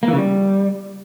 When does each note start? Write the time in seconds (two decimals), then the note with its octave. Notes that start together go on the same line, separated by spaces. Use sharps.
0.03 A#3
0.08 E3
0.13 C#3
0.18 G3